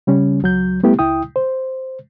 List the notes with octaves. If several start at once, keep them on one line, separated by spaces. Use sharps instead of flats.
C#3 G3 C#4
C#2 F#3 G6
G3 A3 B3 E4 G4
C#2 E4 G5 D#6
C5